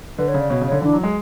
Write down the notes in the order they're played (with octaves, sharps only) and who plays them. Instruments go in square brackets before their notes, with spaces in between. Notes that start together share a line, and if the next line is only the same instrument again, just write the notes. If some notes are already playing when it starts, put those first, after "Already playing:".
[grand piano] D3 [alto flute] B4
[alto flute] C#5
[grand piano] C#3
[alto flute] D5
[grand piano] B2 [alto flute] C#5
[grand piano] C#3
[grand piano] D3 [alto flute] C#5
[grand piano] E3 [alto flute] D4
[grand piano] F#3
G#3